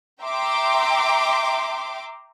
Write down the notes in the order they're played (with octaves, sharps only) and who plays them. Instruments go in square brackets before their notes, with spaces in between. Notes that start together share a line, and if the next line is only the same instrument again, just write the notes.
[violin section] E5 G5 A#5 C6 D6